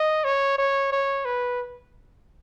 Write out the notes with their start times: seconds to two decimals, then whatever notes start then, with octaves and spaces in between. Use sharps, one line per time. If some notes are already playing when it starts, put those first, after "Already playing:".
Already playing: D#5
0.24 C#5
0.58 C#5
0.93 C#5
1.25 B4